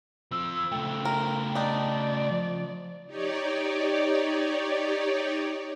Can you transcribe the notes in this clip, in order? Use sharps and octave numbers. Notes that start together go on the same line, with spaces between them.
F3 C4 E6
C#3 A3 G5
A#4
D4 D#4 D5
F3
D#4 G4 C#5 D5